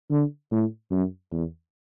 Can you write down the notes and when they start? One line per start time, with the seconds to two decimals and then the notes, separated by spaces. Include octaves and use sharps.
0.10 D3
0.52 A2
0.91 F#2
1.32 E2